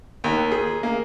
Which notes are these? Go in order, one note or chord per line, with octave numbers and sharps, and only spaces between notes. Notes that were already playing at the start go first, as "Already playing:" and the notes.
D#2
G#4
A#3